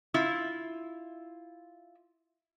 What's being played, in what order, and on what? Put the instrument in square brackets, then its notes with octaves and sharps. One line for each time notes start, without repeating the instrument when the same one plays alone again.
[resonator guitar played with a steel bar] E4 F4